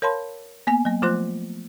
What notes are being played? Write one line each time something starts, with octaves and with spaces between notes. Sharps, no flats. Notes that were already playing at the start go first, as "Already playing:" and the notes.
A#4 C#5 F5 A5 B5 C6
A#3 B3 G#5
F#3 A#3
F3 A3 F4 C5 C6 F#6